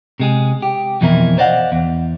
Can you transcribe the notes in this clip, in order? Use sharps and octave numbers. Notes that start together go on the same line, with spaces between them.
C3 G#3 G#4
G4
F2 B2 E3 F3 E4 A#4
C5 D5 D#5 F5 F#5
E2